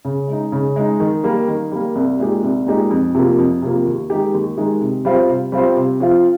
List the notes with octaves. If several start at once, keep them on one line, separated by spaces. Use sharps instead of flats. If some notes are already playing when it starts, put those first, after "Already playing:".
C#3
G#3 D#4
C#3
G#3 D#4
D#3
G3 A#3
D#3
G3 A#3
C2
A#2 G#3 D#4 G4
C2
A#2 G#3 D#4 G4
F2
C3 F3 A#3
F2
C3 F3 A#3
D#2
D#3 G#3 D#4 G4
D#2
D#3 G#3 D#4 G4
C3
G3 C4 F4 C5
C3
G3 C4 F4 C5
C3
F3 C4 F4